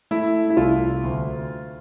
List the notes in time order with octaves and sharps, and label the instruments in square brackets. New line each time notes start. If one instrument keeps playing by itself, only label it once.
[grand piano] A3 E4
E4
C2 F4
D2